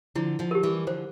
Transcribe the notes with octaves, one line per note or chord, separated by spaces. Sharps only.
D3 F3 E4
D3 F3
G4 A#4
E3 G3
D3 F3 C5